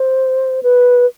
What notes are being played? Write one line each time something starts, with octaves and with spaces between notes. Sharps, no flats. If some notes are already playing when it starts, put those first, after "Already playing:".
Already playing: C5
B4